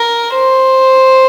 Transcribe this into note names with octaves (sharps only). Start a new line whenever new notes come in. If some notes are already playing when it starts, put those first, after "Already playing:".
Already playing: A#4
C5